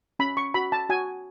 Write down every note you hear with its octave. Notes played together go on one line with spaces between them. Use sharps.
C#4 B5
C#6
F#4 B5
A5
F#4 G#5